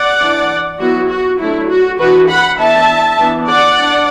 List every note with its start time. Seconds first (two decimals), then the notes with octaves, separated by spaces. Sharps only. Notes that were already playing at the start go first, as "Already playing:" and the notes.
Already playing: D5 F#5
0.20 E3 D4
0.80 F#3 B3 E4 F#4
1.10 F#4
1.39 F#3 A3 D4 E4
1.70 F#4
1.99 E3 D4 F#4 B4
2.29 F#5 B5
2.59 E3 B3 D4 E5 A5
3.19 E3 B3 D4
3.49 D5 F#5
3.79 D4